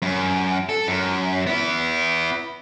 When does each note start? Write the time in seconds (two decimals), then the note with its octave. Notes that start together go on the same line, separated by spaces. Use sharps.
0.02 F#2
0.69 A4
0.87 F#2
1.47 B3 E4